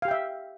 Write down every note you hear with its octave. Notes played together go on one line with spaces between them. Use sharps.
G4 E5 F5 G5